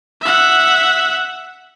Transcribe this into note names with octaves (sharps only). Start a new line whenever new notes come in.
E5 F#5